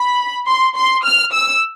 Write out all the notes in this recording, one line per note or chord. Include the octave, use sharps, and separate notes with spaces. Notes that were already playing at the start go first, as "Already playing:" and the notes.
Already playing: B5
C6
C6
F6
E6